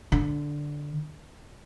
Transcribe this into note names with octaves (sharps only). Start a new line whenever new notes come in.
D3